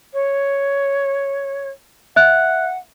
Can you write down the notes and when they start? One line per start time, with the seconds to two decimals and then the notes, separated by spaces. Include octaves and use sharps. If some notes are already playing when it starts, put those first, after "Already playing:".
0.14 C#5
2.16 E5 F#5 F#6